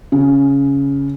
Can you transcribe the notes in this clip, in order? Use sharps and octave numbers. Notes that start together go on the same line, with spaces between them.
C#3